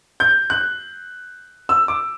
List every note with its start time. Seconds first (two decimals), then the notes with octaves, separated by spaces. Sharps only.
0.20 G6
0.50 F#6
1.69 E6
1.88 D6